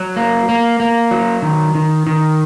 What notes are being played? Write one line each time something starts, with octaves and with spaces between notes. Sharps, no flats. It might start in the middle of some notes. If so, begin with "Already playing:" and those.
Already playing: F#3
A#3
A#3
A#3
F#3
D#3
D#3
D#3